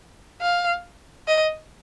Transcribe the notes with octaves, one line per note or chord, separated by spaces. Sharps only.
F5
D#5